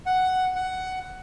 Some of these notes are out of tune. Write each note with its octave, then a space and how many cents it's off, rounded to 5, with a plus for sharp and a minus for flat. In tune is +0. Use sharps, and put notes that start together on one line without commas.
F#5 +5
F#5 +10